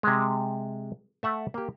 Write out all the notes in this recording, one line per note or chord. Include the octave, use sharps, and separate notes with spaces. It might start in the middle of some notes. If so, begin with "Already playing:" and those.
C3 G#3
A3 E5 F#5
A#3 G4